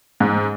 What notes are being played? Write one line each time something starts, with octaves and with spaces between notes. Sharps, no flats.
G#2